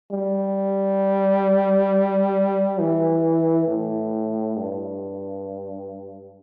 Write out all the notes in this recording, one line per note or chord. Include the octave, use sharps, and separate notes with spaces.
G3
E3
A2
G2